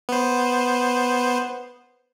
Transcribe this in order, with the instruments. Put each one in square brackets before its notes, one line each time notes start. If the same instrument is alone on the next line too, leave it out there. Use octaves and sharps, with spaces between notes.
[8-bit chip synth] B3 C5